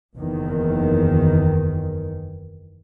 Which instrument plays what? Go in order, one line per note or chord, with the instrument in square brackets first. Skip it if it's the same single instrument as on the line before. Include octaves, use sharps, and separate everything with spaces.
[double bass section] F#1 E2 D#3